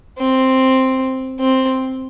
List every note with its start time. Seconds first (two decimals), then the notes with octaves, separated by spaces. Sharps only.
0.19 C4
1.40 C4